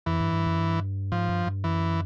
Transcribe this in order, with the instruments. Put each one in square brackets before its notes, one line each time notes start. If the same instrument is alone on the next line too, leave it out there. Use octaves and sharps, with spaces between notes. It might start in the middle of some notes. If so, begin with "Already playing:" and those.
[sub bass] F2 [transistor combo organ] E3
[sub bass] G2
G2
F#2
G2
[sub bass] G#2 [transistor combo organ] F3
[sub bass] G2
G2
[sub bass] F#2 [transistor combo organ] E3